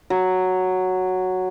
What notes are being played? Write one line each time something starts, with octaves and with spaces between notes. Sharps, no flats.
F#3